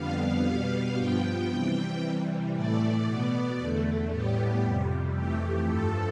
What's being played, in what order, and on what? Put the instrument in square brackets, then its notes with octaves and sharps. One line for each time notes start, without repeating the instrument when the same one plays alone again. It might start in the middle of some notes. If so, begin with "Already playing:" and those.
Already playing: [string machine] F2 D3 G3 B3 F5
B2 G3 B3
G2 F3 B3 G5
C3 E3 G3 G5
C3 E3 G3
A2 E3 A3 D5
B2 B3
E2 D3 A3
A2 G3 B3 G4
F2 C3 G3
F2 E3 A3 G4
G2 F3 A3 A4